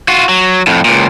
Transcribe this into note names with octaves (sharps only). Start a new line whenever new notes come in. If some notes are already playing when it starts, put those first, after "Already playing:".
F4 F#4
F#3
F2 A2
C#2 A#2